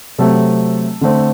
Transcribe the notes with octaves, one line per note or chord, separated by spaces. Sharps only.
C3 F#3 A3 C4 A4
D3 A3 C4